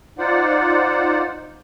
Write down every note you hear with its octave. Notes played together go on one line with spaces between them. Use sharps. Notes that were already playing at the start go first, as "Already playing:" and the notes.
D#4 F4 C5 D5 F#5